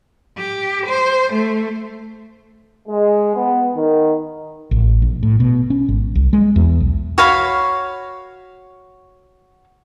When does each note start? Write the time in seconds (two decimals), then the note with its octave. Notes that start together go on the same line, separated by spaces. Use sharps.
0.38 G4
0.87 C5
1.33 A3
2.88 G#3
3.36 B3
3.76 D#3
4.71 A1
5.02 A#1
5.23 A2
5.40 B2
5.70 C#4
5.89 G#1
6.15 C2
6.33 G#3
6.56 E2
6.80 B1
7.18 F#4 C#5 F5 B5